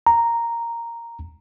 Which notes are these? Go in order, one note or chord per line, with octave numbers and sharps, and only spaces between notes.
A#5